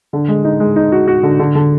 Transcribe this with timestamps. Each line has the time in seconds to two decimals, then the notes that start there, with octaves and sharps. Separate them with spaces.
0.13 D3
0.28 G#3
0.44 D#4
0.60 G#3
0.76 D#4
0.92 F#4
1.08 F#4
1.23 D3
1.39 D3
1.55 D3